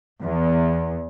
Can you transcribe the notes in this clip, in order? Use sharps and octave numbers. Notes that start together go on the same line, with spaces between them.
E2